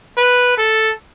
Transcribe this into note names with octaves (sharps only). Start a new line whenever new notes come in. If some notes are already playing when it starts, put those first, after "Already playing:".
B4
A4